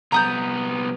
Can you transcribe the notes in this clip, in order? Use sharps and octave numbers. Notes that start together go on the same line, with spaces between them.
C2 B3 A#5 D#6 G6